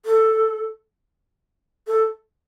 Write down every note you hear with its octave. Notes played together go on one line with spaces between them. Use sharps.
A4
A4